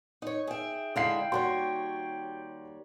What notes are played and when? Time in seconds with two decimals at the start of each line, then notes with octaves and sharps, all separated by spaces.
0.22 D#4 C#5
0.47 G#4 E5 G5
0.96 D3 G#3 E4 F5 C7
1.32 D#2 G3 F#4 C#5 F#5 C6